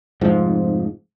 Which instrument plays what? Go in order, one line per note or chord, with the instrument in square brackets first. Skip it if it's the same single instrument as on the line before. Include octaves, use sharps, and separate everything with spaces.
[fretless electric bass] F1 G#2 F3